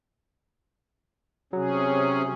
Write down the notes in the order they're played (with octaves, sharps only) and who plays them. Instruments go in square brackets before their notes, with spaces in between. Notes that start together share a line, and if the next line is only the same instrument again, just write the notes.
[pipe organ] C3 C#4 G#4 [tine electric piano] F#3